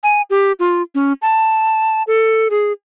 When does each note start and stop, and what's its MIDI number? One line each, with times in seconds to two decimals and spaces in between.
0.03 0.22 80
0.30 0.52 67
0.59 0.82 65
0.95 1.13 61
1.22 2.03 81
2.07 2.48 69
2.50 2.72 68